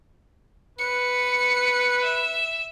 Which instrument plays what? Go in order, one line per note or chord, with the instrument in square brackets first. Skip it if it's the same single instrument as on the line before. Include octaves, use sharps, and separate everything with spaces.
[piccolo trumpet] B4 [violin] C#7
[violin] E5